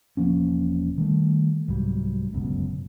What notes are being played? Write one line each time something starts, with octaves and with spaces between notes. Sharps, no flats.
E1 F3 A#3 C#4
D#3 G3 A3
C2 G#2 F#3 G3
G1 C#2 F#2 B2